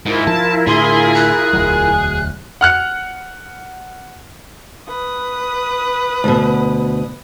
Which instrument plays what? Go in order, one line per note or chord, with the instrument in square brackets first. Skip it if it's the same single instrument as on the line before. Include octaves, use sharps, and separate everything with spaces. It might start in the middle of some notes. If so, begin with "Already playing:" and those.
[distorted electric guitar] G#2 [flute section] E4 F4 A#4
[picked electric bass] F3 [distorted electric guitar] A5
[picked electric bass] A2 D3 [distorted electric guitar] G#4 [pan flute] C6
[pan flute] F#6
[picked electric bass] E1 D2 F#3
[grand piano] F#5 F6 F#6 C#7
[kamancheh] B4 D#6
[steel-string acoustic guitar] D2 B2